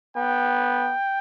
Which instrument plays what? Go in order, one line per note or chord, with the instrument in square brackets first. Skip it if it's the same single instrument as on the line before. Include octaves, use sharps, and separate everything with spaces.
[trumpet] B3 [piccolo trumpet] G5